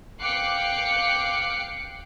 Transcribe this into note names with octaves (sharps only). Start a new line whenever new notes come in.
F5 G5 D6 F#6 C7 C#7